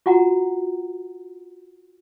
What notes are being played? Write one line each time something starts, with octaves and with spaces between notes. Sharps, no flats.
F4 F#4 F#5 A#5